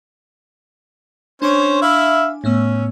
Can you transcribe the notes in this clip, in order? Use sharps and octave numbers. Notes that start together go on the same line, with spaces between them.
C#4 D4 C5 C#5 G#5 D6
E4 E5 F5
A2 B3 C#4 E6